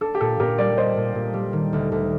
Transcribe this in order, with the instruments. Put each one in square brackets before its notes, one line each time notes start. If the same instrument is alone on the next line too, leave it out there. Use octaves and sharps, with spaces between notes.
[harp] D4 [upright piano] A4
[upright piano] G4
[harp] A#2 [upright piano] A4
[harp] A#2 [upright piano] G4 A#4
[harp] G3 [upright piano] A#4 D5
[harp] D4 [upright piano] C5 D#5
[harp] A#2
A#2
G3
D#3
D2
D2